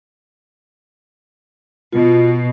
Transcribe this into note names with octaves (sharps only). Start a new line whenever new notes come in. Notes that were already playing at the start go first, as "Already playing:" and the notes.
B2 F4